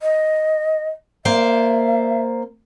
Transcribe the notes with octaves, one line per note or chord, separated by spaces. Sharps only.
D#5
A#3 C5 D5 E5